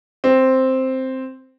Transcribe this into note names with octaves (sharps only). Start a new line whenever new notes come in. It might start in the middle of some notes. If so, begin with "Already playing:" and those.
C4